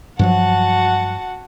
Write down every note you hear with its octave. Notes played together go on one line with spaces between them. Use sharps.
G2 F3 F#3 F#4 F#5 A5